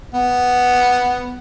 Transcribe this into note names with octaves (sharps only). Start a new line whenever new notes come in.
B3